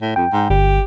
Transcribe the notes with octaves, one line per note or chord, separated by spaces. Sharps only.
A2
F2 G5
G#2
G1 G4